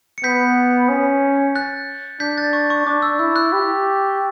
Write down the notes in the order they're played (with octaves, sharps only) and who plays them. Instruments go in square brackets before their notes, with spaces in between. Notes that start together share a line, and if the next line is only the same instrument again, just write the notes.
[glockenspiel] C#7
[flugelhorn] B3 [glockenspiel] G6 B6
[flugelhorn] C#4
[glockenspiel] F#6 A6
[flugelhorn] D4 [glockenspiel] G6 B6
[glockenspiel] F#6 A6
C#6
C#6
[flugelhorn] D4 [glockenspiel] D6
[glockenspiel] E6
[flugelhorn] E4 [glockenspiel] E6
[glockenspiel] F#6
[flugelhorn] G4